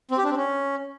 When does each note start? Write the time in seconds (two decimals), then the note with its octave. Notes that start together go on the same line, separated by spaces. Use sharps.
0.11 C4
0.18 G4
0.24 D4
0.31 C4
0.37 C#4